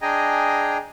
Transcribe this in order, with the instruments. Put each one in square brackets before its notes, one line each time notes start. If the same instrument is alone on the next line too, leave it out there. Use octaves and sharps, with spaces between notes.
[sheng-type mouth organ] D4 G#4 D#5 G5 G#5 A#5